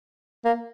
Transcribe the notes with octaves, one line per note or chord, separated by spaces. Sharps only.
A#3